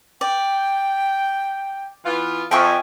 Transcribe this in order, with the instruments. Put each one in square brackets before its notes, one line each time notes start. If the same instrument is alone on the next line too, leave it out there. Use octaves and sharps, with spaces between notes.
[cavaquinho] D5 [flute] G5
[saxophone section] E3 B3 F4
[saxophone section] F2 [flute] E5 [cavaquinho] G5 G#5 C#6